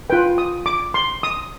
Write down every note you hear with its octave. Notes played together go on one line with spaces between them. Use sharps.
F4 B4 G5
D#6
D6
C6
D#6